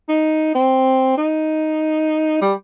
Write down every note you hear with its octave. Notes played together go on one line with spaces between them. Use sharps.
D#4
C4
D#4
G3